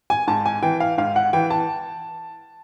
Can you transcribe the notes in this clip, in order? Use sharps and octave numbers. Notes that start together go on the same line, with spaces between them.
G#5
G#2 A5
G#5
E3 G5
F5
G#2 F5
F#5
E3 G5
A5